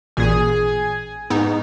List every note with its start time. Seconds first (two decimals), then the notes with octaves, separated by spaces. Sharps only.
0.17 A1 A#2 G#4 G#5
1.30 G#2 B3 D#4